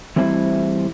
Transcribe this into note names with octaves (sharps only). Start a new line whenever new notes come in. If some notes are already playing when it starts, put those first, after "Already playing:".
E3 G3 A3 C4 E4 C5